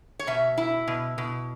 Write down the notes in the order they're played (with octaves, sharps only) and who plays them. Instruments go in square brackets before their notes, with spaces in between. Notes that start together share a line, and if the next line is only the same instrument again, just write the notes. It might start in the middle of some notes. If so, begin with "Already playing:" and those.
[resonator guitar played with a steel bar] C#5
B2 E5
E4
B2
B2